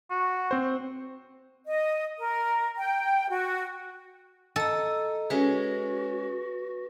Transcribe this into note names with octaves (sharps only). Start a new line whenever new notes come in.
F#4
C4 C5
D#5
A#4
G5
F#4
A4 D#5 A#5
G#3 C#4 F#4 B4